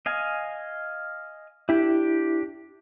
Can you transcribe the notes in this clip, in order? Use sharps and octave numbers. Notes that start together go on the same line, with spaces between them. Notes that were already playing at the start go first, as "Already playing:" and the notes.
D#5 F5 G#5
D4 E4 G4